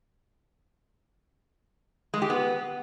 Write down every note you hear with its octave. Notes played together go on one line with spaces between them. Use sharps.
G#3
G4
B3